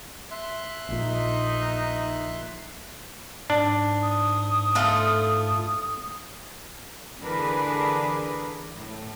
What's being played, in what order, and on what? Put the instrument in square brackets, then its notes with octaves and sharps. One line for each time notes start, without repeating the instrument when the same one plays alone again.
[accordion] E5 C6 F#6
[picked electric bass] A#1 A#2 [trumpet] D#4
[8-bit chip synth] G#2 [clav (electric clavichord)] D4
[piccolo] D#6
[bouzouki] A3 F4 A4
[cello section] D3 E3 D4 G#4 A#4 B4
A2